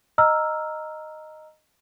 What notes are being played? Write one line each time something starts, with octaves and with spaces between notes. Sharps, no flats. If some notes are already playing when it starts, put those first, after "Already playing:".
D#5 A#5 E6 F6